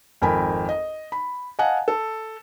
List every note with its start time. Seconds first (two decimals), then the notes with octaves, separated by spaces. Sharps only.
0.22 G#1 F2 A#4 G5 G#5 B5
0.69 D#5
1.12 B5
1.59 D#5 F5 F#5 G#5 A5
1.88 A4